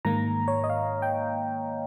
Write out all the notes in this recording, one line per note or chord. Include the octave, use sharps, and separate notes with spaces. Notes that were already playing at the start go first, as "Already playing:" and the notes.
G#2 D#3 A#3 A#5
C#5
D#5
F5
G5